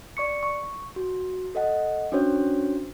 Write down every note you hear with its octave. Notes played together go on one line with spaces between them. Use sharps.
D5 C#6 C#7
C#6
F#4
A4 D#5 F#5
C#4 D4 F#4 C5 C#5